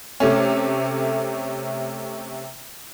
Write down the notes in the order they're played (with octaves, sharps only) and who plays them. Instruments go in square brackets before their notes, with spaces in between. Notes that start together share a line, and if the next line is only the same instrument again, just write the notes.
[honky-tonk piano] C3 A3 C#4